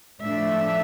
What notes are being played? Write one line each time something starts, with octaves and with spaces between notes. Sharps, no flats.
A2 F3 A3 D4 E5